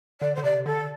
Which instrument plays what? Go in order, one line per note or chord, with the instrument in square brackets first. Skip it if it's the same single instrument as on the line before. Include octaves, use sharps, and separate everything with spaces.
[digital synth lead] D3 [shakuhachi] D5
[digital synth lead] D3 [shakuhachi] C5
[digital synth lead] C3 [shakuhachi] D5
[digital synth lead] D3 [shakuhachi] A4